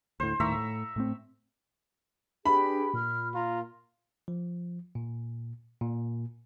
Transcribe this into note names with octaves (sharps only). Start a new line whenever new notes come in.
D2 A2 C5
D#1 A2 D#3 E5 A#5 C#6
A2
A2 A3 C4
D4 G4 G#4 B4 B5
A#2 F6
F4 A#5
F3
A#2
A#2